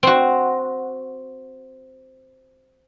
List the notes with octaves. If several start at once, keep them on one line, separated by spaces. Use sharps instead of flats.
C4 F#4